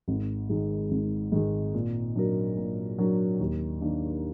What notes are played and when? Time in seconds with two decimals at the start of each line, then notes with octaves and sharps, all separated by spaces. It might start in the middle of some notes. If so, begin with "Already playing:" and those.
0.08 G#1
0.49 G#2 D#3 G#3
0.91 G#1
1.32 G#2 D#3 G#3
1.74 A#2
2.16 F#3 D4 F#4 A#4
2.57 A#2
2.98 F#3 D4 F#4 A#4
3.40 D#2
3.81 D#3 A#3 D4